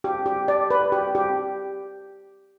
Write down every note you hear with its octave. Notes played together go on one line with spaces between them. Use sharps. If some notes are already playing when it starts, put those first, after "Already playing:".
G4
G4
D5
B4
G4
G4